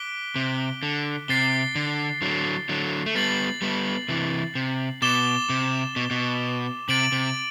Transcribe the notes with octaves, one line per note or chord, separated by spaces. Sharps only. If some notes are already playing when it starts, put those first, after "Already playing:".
Already playing: D6 F#6 B6 D7 G7
C3
D3
C3 A6 C7 G7
D3
D3 F#3
D3 F#3
A3
G3 B3 A6 C7 F#7
G3 B3
C3 E3
C3
B2 D6 A6 E7 G7
C3
B2
B2
C3 A6 D7 F#7
C3